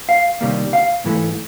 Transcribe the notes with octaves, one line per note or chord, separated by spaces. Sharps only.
F5
C3 D#3 G3 A#3
F5
G#2 E3 A3